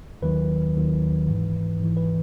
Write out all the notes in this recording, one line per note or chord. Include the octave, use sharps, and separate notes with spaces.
D#2 D#3 F#3 B4
D#2 D#3 F#3
G#2 E3
G#2 E3
B4